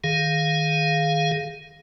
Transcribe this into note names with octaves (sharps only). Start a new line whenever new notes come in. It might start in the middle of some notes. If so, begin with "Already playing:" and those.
D#3 G#4 F5